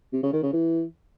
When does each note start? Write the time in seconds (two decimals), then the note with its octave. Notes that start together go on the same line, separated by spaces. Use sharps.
0.13 C3
0.23 C#3
0.33 D#3
0.43 C#3
0.53 E3